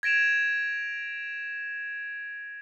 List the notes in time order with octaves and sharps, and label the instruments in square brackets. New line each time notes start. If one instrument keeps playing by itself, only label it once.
[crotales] G#6 A#6 D7 E7 F7